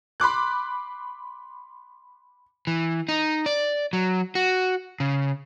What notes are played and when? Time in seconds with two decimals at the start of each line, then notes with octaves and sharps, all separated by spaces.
0.20 B5 C6 D6 F#6
2.67 E3
3.09 D#4
3.46 D5
3.93 F#3
4.35 F#4
5.00 C#3